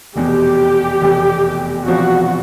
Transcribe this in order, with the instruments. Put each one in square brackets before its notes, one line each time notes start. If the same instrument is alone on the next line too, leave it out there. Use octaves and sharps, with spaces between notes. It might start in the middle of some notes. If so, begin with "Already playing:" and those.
[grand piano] F1 E2 B2 [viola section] G4
[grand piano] F1 E2 B2
[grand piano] E1 E2 C3 F3 [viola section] F#4